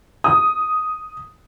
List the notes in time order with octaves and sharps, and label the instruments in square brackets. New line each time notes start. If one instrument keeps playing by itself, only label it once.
[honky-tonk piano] D#6